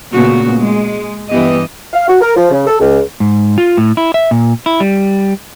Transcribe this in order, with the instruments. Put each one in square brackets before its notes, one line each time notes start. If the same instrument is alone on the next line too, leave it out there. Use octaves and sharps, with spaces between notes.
[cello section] A#2 C#3 A3 B3 F#4
G#3
G2 E3 B3 G4 D#5
[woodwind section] F5
F#4
A#4
F3
C#3
A4
C#2
[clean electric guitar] G#2
F4
A2
E4
E5
A#2
E4
G3